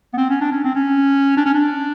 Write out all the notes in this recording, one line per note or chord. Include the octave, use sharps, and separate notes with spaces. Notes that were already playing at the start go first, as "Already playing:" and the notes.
B3
C4
C#4
D4
C#4
C4
C#4
D4
C#4
D4